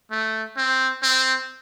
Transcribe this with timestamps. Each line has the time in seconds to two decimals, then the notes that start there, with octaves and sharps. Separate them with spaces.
0.11 A3
0.57 C4
1.02 C4